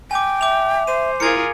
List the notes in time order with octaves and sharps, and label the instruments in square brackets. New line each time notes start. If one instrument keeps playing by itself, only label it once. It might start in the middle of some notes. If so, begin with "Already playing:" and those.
[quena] G5 [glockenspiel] G#5 D6
[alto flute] E5 [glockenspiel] D6 F7
[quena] C5 [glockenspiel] D#7
[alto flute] E4 [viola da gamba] F4 G#4 A#4 [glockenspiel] G#6 C#7